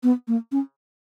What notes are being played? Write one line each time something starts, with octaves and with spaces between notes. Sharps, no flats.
B3
A#3
C#4